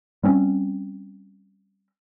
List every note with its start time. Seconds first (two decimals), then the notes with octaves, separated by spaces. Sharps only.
0.24 G3 C4 C#4